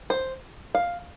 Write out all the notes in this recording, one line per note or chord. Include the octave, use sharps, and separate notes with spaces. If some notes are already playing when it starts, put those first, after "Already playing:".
C5
F5